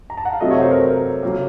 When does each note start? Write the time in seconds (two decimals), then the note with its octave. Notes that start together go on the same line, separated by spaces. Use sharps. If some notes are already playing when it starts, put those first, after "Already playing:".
0.10 A#5
0.17 A5
0.25 F#5
0.33 F5
0.40 C3 F#3 A3 D#5
0.51 C#5
0.61 C5
0.71 A#4
0.82 A#4
1.23 C#3 F#3 A#3